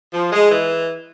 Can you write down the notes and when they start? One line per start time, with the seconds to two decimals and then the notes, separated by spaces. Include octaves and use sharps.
0.13 F3
0.32 G#3
0.50 E3